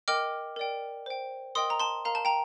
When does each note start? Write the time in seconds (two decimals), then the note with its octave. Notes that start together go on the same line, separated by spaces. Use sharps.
0.08 A#4 D#5 G5 D6 F6
0.56 A#4 D5 G5
1.06 C5 G5
1.55 A#4 D#5 G5 C6 D#6
1.70 A#5
1.80 A5 C6
2.05 A#4 F5 A#5
2.15 A5
2.25 G5 A#5